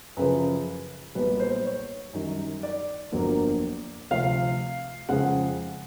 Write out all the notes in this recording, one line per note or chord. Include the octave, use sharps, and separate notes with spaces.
F#2 C#3 F3 B4
B1 A#2 G3 B3 B4
C5
C#5
F#2 D#3 G3
D5
G1 F2 D3 F#3 A#3
D2 C3 F3 F5
F2 C#3 F3 G#3 F#5